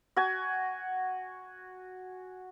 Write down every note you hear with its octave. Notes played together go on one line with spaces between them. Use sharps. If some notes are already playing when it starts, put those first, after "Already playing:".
F#4 G#5